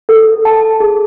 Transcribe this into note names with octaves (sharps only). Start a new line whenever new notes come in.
A4
A5
G#4